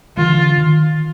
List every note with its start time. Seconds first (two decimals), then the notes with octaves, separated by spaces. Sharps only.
0.17 D3 E3 F4
0.58 D#3